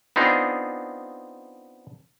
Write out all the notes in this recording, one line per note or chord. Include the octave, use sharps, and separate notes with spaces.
B3 C4 D4 D#4 F4 G#4